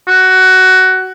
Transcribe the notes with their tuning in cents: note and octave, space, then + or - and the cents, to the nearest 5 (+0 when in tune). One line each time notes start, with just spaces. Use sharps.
F#4 +15